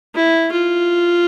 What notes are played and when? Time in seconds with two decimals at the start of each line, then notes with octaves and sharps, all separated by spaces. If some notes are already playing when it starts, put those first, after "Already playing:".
0.15 E4
0.52 F4